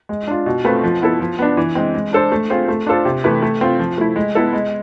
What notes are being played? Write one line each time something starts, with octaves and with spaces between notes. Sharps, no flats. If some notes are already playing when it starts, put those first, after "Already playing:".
G#3
D4 F4
B2
A3 C4 F4 B4
F3
B3 E4 A4
F3
B3 D4
E3
G#3 C4
G#3
D4 A4 C5
A3
C4 F4 G#4 C5
A3
D4 F4 A4 C5
C3
E3 A3 E4 B4
A3
C4 F4
F3
A3 E4
G#3
B3 E4 A4
G#3